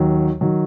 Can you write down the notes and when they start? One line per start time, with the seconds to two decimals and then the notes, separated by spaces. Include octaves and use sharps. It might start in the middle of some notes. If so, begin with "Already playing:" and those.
Already playing: D#2 D#3 F#3
0.41 D#3 F#3